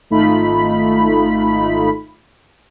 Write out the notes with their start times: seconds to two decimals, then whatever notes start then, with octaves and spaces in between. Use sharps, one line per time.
0.10 G#1 A3 D#4 F4 B5